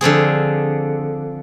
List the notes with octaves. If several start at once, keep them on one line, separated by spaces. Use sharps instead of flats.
D3 F3 C4 G#4